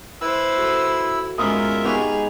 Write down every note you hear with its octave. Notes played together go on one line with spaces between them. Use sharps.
E4 B4 C5 E6
F#4 A4
G#2 B3 C#4 F4 A#4 E5 D#6
B3 D#4 G4 G#4 B4 C#6 F7